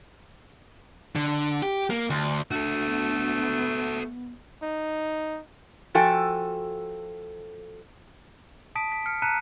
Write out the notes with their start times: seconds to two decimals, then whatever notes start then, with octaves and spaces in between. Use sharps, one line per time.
1.16 D3
1.62 G4
1.90 A#3
2.10 D2
2.51 D2 A3 F#4 A4
2.84 B3
4.63 D#4
5.95 F3 F#4 A4 G5 G#5
8.75 A5 D#6 B6 D7
8.92 B6
9.06 F6 C#7
9.22 A5 A#5 F#6 B6 C#7 D#7